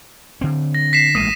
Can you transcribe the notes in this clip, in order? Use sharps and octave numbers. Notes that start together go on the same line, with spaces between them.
D3 C4
A#6
B6 C7 E7
A1 G#3 A#3 D#6 C7 D#7